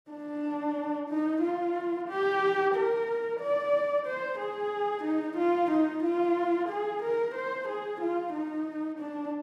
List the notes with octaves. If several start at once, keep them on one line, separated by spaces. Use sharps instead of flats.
D4
D#4
F4
G4
A#4
D5
C5
G#4
D#4
F4
D#4
F4
G#4
A#4
C5
G#4
F4
D#4
D4